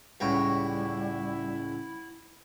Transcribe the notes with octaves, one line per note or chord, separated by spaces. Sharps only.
C#2 A2 G3 E4 F#4 C#5 G5 B5